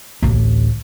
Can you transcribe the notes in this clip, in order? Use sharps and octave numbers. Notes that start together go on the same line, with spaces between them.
A1 D2